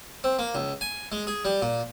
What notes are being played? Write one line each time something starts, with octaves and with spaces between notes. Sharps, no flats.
C4
A#3
C#2
G#5
G#3
G#4
G3
A#2